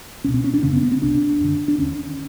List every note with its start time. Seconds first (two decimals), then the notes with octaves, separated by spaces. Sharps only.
0.24 C#2 B2 C#4
0.34 C4
0.44 C#4
0.54 D4
0.63 F#2 C#3 C#4
0.73 B3
0.83 B3
0.91 C4
1.01 C2 C3 D4
1.40 F#2 D3
1.68 D4
1.78 D#2 D3 C#4